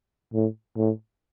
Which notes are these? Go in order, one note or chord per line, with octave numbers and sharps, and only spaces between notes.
A2
A2